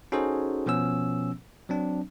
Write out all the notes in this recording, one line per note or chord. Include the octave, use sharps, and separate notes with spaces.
C#4 D#4 F#4 G#4 A4 C5
B2 F3 B3 C#4 E6
F#3 C4 D4